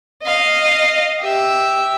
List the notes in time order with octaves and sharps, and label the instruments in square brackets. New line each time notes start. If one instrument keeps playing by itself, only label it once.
[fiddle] D#5 F5
G4 E5